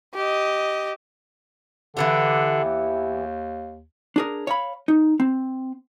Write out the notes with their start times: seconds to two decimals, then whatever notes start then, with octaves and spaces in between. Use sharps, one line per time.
0.15 G4 D#5
1.97 D3 E3 B3 G4
2.64 D#2
4.16 D4 G#4 A#4
4.47 C#5 F5 B5
4.88 D#4
5.20 C4